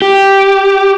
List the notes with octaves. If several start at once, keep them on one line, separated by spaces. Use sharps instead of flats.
G4